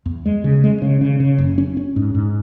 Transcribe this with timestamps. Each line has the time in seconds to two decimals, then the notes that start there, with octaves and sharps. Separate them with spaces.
0.06 E2
0.26 G#3
0.44 C#3
0.64 G#3
0.82 C#3
1.01 C#3
1.20 C#3
1.38 F#1
1.58 C#4
1.77 C#4
1.96 G#2
2.15 G#2